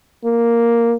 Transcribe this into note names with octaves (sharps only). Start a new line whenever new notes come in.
A#3